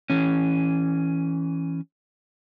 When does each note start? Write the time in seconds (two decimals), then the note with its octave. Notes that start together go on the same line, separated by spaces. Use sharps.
0.10 E3 C#4